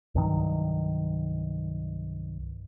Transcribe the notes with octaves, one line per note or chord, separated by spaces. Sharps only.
C2 G2 D#3 F#3